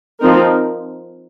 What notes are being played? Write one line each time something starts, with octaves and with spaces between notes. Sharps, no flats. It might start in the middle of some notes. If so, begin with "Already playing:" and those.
F3 C4 D#4 A#4